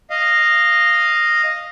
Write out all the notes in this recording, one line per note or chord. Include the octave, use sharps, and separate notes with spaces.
D#5 F5